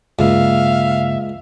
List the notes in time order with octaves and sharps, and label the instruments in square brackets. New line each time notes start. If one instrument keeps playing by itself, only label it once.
[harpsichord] C#2 [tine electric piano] G2 C#3 A#3 [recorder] E5 [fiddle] F5